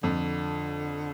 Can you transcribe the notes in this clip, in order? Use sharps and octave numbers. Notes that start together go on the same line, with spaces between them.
F2 D3